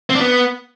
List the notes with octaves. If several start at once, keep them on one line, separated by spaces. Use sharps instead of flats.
C4
D4
B3